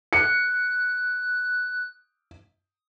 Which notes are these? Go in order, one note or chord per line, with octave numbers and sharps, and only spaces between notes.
F#6 C#7